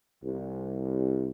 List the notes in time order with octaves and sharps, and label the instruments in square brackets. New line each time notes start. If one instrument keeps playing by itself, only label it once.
[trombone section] C2